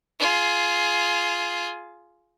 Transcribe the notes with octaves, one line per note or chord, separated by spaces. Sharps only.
F4 G#4